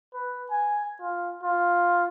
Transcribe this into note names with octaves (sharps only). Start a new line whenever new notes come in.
B4
G#5
F4
F4